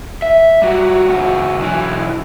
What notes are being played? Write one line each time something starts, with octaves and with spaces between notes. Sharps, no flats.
E5
G3 F#4
C#2 F#4
B1 E3